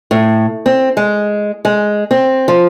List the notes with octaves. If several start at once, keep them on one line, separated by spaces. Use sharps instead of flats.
A2
C4
G#3
G#3
C4
F3